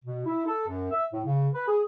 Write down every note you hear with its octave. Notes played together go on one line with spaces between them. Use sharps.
B2
E4
A4
F#2
E5
A2
C#3
B4
G#4